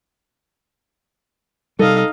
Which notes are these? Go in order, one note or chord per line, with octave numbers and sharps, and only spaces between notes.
C3 G3 D#4 A4 F5